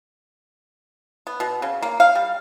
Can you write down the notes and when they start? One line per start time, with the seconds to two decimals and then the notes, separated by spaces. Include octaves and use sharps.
1.27 B3
1.40 B2
1.62 C#3
1.82 A#3
2.00 F5
2.15 G3